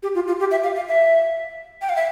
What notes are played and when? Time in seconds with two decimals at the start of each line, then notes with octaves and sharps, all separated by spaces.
0.03 G4
0.15 F4
0.27 F4
0.40 G4
0.51 E5
0.63 F5
0.76 F5
0.88 E5
1.82 G5
1.89 F5
1.96 E5